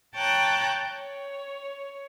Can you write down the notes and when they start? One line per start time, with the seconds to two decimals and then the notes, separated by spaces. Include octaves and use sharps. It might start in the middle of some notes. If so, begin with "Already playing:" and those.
0.15 C#5 G5 A5 A#5 F#6
0.90 C#5